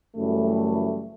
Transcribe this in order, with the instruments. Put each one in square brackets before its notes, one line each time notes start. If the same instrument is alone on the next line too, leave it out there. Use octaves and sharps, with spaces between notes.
[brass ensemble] F#1 F#2 E3 G3 A3